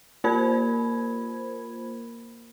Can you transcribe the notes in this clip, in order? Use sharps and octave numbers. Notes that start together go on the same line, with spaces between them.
A#3 F4 A#4 C5 B5 G#6